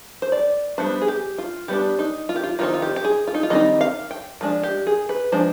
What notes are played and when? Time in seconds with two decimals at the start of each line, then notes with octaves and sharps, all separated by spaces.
0.22 C5
0.32 D5
0.78 G3 B3 D4 C5
1.01 G#4
1.08 G4
1.38 F4
1.68 G3 B3 D4 G4
1.99 D#4
2.29 F4
2.36 G4
2.44 F4
2.59 D#3 G3 C4 D#4 F4
2.74 F4
2.82 G4
2.96 G4
3.05 G#4
3.27 F4
3.34 D#4
3.43 F4
3.50 D#3 G3 C4 D#4 D#5
3.81 F5
4.11 G5
4.41 F3 G#3 D4
4.63 G4
4.87 G#4
5.09 B4
5.32 F3 G#3 D4 C5